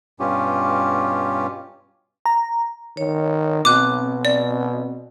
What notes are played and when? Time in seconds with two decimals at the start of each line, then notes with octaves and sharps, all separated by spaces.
0.20 G2 B2 C#4 F4 G4
2.26 A#5
2.97 D#3 C#5
3.65 B2 C4 D6 F#6
4.25 D5